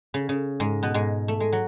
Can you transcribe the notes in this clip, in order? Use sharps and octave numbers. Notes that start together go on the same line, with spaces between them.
C#3
C#3
G#2 G#3
B2 B3
G#2 G#3
A3
G#3
F#3